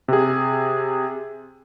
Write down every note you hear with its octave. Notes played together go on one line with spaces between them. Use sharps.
C3 G#4